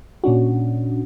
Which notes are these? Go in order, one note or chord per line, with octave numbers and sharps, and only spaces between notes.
A#2 C#4 D4 F#4